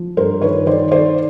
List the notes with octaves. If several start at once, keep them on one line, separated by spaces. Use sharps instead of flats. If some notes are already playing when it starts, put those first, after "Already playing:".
Already playing: F3
G2 A#4 C5
D#3 B4 C#5
D#3 C5 D5
D#3 C5 D5